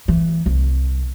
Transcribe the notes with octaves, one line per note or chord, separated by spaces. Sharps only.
E3
C2